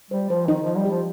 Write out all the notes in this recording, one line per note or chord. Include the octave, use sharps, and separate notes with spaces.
G3 C5
F3 C5
D#3 D#4
F3 D#5
G3
G4
F3